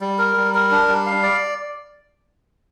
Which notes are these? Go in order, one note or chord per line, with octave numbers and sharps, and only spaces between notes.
G3
A#4
G3
A#4
D4
G3
F5
D5